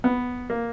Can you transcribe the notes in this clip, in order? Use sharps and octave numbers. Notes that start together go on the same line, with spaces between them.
B3
A#3